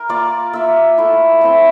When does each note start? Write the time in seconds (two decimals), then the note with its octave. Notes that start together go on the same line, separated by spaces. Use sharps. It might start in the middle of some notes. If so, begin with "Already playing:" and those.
Already playing: A#4
0.09 A#3 F4 D5
0.53 A#3 F4 E5
0.98 A3 E4
1.41 A3 C4 E4